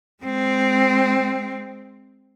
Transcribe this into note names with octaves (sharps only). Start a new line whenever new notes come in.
G#3 C4